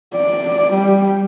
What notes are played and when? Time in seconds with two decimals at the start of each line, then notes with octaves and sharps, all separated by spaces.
0.15 D5
0.74 G3